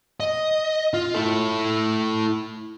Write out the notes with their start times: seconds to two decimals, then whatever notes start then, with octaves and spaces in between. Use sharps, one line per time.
0.20 D#5
0.94 F4
1.14 E4 A4